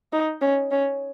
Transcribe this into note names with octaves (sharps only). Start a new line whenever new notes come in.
D#4
C#4
C#4